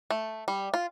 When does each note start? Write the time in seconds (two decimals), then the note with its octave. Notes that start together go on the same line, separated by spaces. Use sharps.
0.10 A3
0.48 G3
0.74 F4